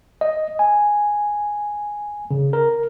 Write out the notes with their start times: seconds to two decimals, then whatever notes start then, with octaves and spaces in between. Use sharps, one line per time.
0.21 D#5
0.59 G#5
2.31 C#3
2.53 A#4